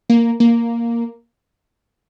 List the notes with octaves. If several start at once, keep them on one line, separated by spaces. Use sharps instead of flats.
A#3
A#3